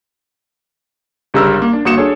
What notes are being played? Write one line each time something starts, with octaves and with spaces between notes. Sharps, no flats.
G1 C#3 G3 G#3 A#4 E6
A#3
D4
G1 A#3 F#4 D#6 C#7 E7
D4 G#4 A4 C#5